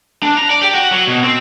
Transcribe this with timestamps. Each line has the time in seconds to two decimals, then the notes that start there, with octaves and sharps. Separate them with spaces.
0.23 D4
0.37 A#5
0.50 D5
0.62 G4
0.75 F#4
0.92 F#3
1.07 B2
1.24 C4